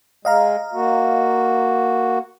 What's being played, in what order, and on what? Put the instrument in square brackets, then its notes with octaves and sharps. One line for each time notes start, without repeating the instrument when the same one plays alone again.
[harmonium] G#3 [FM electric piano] D#5 F5 A#5
[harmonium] A#3 F#4